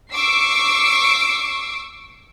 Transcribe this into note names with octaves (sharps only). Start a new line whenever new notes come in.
C#6 D6 E6 C7